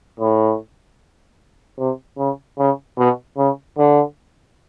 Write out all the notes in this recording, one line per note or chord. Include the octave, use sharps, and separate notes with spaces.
A2
C3
C#3
C#3
B2
C#3
D3